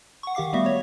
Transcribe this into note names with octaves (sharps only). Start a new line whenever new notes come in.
F#5 C#6
D#3 G4 F5 D6 C7
G3 A3 B3 F#4 E5
C#5